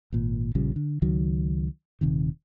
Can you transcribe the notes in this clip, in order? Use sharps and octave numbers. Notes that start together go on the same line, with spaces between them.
G#1 A#2
A#1 C#3 F3 G3
D3
C#2 D#3 F#3
D#1 C3 D#3